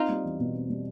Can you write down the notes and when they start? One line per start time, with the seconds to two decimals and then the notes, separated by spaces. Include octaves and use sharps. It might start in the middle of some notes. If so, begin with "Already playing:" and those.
Already playing: C4 D#4 F4
0.09 G3
0.24 E2
0.39 B2
0.54 C4
0.69 G3